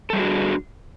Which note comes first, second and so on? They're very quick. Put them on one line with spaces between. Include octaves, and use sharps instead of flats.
A4 G3 G#4 F#4 D4